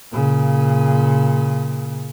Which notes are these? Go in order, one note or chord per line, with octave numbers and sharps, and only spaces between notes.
A#2 C#3